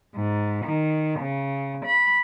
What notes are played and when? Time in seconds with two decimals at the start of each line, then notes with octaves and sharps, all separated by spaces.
0.13 G#2
0.64 D#3
1.19 C#3
1.84 B5